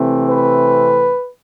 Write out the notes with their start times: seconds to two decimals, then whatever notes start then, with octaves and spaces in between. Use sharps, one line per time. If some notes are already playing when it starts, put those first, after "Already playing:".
Already playing: C3 E3 A3 C4
0.26 B4